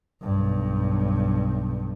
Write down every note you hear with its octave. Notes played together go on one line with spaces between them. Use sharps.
B1 G2